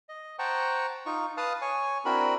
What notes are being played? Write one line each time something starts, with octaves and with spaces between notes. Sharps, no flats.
D#5
C5 F#5 G5 A5 A#5 C#6
D#4 F4 C#6
B4 F5 A5 D#6 F6
C#5 G#5 C#6
C4 D4 E4 F#4 A#4 B5